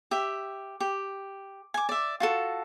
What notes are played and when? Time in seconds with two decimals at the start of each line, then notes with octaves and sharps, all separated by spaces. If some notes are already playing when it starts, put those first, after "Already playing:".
0.11 G4 E5
0.80 G4
1.74 G#5 D6
1.89 D5 E5
2.20 F4 F#4 A4